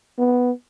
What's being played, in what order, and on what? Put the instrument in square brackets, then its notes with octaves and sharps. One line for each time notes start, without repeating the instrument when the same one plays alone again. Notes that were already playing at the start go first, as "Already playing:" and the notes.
[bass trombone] B3